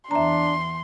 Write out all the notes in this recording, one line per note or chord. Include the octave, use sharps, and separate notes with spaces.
E2 D4 E5 A#5 C6